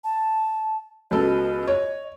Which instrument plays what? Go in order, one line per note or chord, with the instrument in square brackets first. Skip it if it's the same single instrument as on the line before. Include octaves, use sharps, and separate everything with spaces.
[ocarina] A5
[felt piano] C#2 B2 A4 [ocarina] D#5
[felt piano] C#5